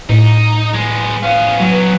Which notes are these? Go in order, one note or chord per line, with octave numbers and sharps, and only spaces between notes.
A2 D#4
G#3 B3
B3 C#4 F5
F#3
B4